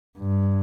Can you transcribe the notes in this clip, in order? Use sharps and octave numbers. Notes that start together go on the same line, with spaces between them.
G2